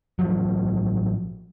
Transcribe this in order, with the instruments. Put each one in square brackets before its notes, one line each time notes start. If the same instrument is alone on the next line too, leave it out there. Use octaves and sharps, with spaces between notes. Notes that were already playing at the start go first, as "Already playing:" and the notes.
[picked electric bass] A1 F3 F#3